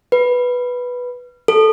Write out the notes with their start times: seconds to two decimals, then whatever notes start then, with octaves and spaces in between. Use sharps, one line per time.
0.12 B4
1.48 A4